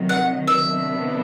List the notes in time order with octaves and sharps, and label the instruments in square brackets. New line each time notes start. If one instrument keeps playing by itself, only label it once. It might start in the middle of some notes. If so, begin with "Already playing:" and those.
Already playing: [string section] C3 D#3 F#3
[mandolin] F#5
E5
[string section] C3 D#3 F#3 B3 D4